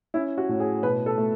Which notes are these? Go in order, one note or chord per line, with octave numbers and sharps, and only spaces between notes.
C#4 E4
F#4
A2
G#4
B2 B4
A4
A3